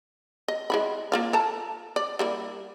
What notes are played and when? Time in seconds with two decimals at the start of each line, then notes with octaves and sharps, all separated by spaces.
0.48 D#5
0.70 G#3 E4 B5
1.12 A#3 F4 F5
1.33 A4 A5 A#5
1.96 D5
2.19 G3 A#3 E4